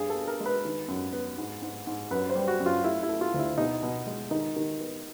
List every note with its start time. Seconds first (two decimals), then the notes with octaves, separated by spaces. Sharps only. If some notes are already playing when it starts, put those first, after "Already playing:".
Already playing: G2 G#4
0.10 A4
0.15 B3
0.28 A#4
0.40 G#3
0.46 B4
0.65 D#3
0.88 F#2
1.13 B3
1.38 G#2
1.62 G#2
1.87 G#2
2.11 F#2 B4
2.30 C5
2.35 G3
2.48 F#4
2.60 F#2
2.66 F4
2.84 A3 E4
3.03 E4
3.09 A3
3.21 F4
3.34 D2
3.39 E4
3.58 B2 D#4
3.83 B2
4.07 G#3
4.31 D#3 D#4
4.56 D#3
4.80 B3